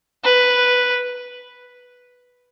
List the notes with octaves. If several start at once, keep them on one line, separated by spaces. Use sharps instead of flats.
B4